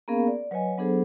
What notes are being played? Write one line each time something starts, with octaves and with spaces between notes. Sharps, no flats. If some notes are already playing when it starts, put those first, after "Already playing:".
A#3 B3 C#4 G#4 A#4 F5
D5
F#3 B4 C#5 D#5 G#5
F#3 B3 D4 G#4 A4 C5